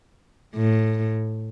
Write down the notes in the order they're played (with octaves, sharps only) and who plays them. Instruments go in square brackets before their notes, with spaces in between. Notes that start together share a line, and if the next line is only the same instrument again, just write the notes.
[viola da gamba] A2